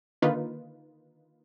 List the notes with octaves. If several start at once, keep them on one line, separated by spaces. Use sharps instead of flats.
D3 D#3 A#3 D#4 F4 B4